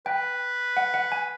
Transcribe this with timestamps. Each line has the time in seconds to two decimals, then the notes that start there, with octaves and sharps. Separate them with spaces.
0.06 B4 G5
0.77 F#5
0.94 F#5
1.12 G#5